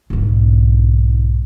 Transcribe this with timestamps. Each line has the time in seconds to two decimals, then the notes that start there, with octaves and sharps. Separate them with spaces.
0.10 B1 G#2